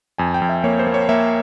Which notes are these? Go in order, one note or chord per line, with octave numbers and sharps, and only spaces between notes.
F2 G#5
G5
F2
E5
A#3 C#5
C5
A#3
C#5
A#3 E5